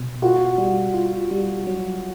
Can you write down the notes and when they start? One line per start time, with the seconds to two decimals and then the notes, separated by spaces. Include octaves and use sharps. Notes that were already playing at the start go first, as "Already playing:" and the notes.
Already playing: B2
0.22 F4 F#4
0.58 G3
0.94 F4
1.31 G3
1.67 F#3